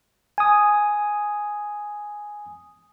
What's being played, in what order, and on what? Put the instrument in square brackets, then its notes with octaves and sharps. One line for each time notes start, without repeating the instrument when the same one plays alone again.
[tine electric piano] G#5 D#6